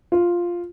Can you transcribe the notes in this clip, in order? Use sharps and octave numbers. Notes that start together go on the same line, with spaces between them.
F4